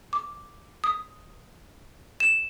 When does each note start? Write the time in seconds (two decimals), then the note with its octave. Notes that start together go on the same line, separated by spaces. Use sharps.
0.13 D6
0.84 D#6
2.20 E7